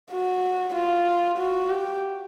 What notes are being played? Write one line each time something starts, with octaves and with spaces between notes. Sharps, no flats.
F#4
F4
F#4
G4